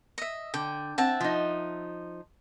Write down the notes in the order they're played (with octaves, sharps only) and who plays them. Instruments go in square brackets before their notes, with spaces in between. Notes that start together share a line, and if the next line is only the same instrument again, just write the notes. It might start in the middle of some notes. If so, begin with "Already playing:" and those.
[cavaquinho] D#5 E5
[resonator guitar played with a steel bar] D3 [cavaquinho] G5
[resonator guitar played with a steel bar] C4 [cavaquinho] E5 F#5 A5
[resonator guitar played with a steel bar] F3 D#4